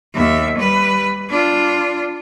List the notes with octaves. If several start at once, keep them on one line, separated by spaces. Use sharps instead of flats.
D#2 E5
G3 B4
D4 F4